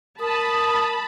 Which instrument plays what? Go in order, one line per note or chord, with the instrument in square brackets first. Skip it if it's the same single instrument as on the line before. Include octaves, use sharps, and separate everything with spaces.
[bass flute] A#4 [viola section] A5 B5 [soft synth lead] D#6